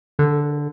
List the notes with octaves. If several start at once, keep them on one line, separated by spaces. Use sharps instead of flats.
D3